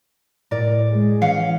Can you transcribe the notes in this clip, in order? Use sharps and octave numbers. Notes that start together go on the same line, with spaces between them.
A2 A#4 D5
G#3
E3 C#4 F5 F#5